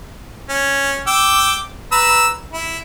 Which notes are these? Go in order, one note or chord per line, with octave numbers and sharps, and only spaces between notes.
C#4
G5 D6 E6
B4 A#5 E6
E4